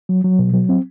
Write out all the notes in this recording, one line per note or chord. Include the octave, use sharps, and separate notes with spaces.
F#3
F#3
B2
F#3
C4